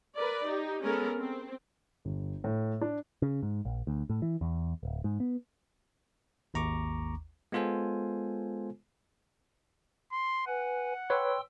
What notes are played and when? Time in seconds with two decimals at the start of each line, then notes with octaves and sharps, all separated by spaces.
0.16 A#4 B4 D5
0.46 D#4 G4
0.83 G#3 B3 C#4 A4 A#4
1.18 C4
2.05 G1
2.44 A2
2.81 D4
3.22 C#3
3.43 G#2
3.65 A#1
3.87 D2
4.10 A2
4.22 E3
4.41 E2
4.83 D1
5.04 G#2
5.20 B3
6.54 G#1 D#2 A#5 C#6 D6
7.52 G#3 B3 F4 A4 C5 G#5
10.12 C6
10.47 B4 F#5 G#5
11.10 B4 C#5 G5 C6 E6